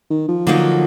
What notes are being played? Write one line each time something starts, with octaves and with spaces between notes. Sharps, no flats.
D#3
F3
D3 F#3 A#3 D#4